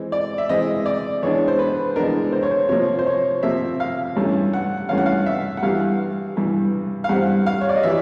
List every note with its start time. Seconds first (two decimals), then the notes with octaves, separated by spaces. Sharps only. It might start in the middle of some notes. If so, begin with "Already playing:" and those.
Already playing: E3 G#3 C4
0.12 D5
0.38 E5
0.49 E3 G#3 C4 D#5
0.86 D5
1.22 E3 G#3 B3 D4 C#5
1.48 C5
1.59 B4
1.96 E3 G#3 B3 D4 A#4
2.33 C5
2.43 C#5
2.51 C5
2.69 C3 F3 A#3 C#5
2.99 C5
3.06 C#5
3.43 C3 F3 A#3 E5
3.80 F5
4.16 G2 E3 A3 C#4
4.53 F#5
4.89 G2 E3 A3 C#4 F5
4.98 F#5
5.06 F5
5.26 E5
5.57 F#5
5.63 G2 E3 G3 F5
6.36 G2 E3 G3
7.04 F5
7.09 G2 E3 G3 C4 F#5
7.46 F5
7.61 C#5
7.69 D5
7.76 D#5
7.83 E3 G3 E5